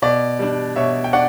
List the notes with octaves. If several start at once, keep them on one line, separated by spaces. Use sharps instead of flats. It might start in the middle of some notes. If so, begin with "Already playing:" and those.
B2 D5
G3 D4
B2 C#5 E5
G5
D4 D5 F#5